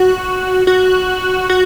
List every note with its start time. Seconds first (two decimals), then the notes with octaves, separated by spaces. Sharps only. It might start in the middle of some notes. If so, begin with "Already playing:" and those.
Already playing: F#4
0.67 F#4
1.50 F#4